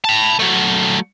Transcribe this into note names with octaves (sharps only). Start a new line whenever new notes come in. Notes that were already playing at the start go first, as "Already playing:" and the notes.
A5 B5
F#3 A3